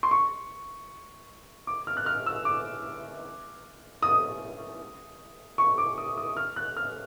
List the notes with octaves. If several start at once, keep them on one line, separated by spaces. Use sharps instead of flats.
C6
C#6
D6
F6
F#6
F6
E6
D6
D#6
C#6
D6
D#6
D#6
F6
F#6
F6